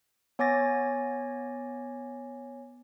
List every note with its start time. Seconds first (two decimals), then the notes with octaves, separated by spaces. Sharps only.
0.39 B3 C#5 G#5 D6 A6 A#6